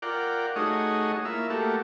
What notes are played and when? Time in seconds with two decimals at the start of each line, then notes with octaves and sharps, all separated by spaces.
0.02 F4 A#4 D5 F#5 G5
0.56 A3 D#4 F#4 G#4 C#5 D#5
1.25 A#3 E4 F4 E5
1.50 A3 A#3 F#4 G4 A4